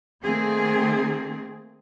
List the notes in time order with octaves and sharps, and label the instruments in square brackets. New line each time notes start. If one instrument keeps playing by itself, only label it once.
[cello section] D#3 A3 A#3 C4 G#4